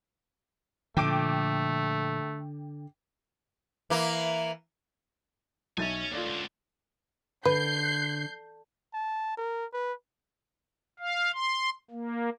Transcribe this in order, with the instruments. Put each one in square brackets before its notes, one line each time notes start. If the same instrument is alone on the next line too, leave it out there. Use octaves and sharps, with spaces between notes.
[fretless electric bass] A#2 F3 [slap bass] D3 [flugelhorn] A3 [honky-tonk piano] G5 D6 D7
[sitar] E3 A#3
[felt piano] B1 E5 A6 [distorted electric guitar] C#5 G#5
[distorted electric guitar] D#2 [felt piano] F4 A4 D5
[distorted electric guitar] C#2 D3
[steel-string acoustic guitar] D3 [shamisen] B4 [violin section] G6 C7
[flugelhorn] A5
A#4
B4
[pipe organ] F5
C6
A#3